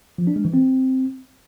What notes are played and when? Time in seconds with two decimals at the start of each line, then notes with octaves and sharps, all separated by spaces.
0.18 F3
0.27 D4
0.36 G#3
0.45 E3
0.54 C4